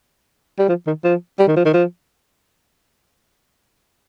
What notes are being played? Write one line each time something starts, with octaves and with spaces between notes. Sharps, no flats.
G3
F3
D#3
F3
G3
D#3
F3
D#3
F3